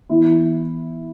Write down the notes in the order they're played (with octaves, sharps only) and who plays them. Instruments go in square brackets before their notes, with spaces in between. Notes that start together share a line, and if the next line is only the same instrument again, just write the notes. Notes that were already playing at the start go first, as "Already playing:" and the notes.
[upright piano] E3 B3 E4